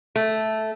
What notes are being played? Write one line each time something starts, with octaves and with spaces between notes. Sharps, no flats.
A3